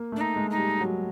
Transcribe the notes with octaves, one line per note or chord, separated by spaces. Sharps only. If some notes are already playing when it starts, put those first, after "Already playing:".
Already playing: A#3
A3 D4
D#4
G#3
D#4
G3
F#3